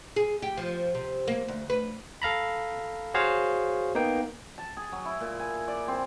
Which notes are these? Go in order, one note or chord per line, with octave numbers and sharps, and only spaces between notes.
G#4
G4
F3
C3
A#3
D2
B4
A4 F5 A#5 B5
F#4 G#4 C5 C#5 F5
A#3 B3 D#4 G5
A5
G#4
F#3
E4
A#2
G#5
D5
C4